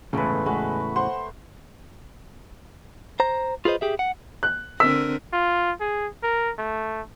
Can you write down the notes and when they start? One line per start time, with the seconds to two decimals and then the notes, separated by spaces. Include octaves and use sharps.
0.13 G1 E2 A2 C#3 G#3 A3 B4
0.46 G#3 F#4 B4
0.96 C5 F#5 C6
3.20 C5 A#5
3.65 F4 G#4 B4 C5 D#5
3.81 G4 G#4 E5
3.99 F#5
4.43 F#6
4.80 D3 C4 A#4 E6 B6
5.33 F4
5.80 G#4
6.23 A#4
6.58 A3